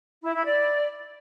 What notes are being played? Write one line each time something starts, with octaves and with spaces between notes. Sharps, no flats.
E4
E4
D5